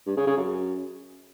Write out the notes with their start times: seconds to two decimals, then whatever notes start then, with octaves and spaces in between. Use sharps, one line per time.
0.07 G2
0.17 C#3
0.27 C#3
0.37 F#2